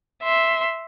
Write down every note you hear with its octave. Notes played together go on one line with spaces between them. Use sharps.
E5 C6